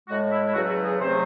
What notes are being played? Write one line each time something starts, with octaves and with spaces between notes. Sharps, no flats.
A2 G#3 F#4
E4
E4
E2 C#3 F#3 A3 F#4
F#4
G#4
E2 C3 F#3 A3 C5